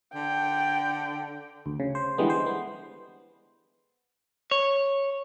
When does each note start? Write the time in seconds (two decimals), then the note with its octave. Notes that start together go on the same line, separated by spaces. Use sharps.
0.15 D3 G5
1.66 D2
1.80 C#3
1.95 C5
2.18 D3 E3 G3 G#3 B3
2.30 C5
2.46 B3
4.51 C#5